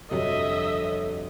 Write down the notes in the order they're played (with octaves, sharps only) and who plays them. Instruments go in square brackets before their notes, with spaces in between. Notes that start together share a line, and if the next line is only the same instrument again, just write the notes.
[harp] G1 F2 [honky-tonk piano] C3 F#3 [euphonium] A4 [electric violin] D#5 E5